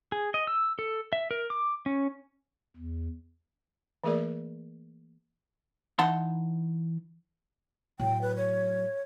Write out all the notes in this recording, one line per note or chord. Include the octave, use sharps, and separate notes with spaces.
G#4
D#5
E6
A4
E5
A#4
D6
C#4
E2
E3 A3 A#3 G#4 A#4 D5
E3 D#4 F#5 A5 C6
A2 F#3 G5
B4
C#5